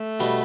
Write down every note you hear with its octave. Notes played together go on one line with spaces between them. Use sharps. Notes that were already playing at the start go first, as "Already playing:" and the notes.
Already playing: A3
B2 G3 B3 D4 F#4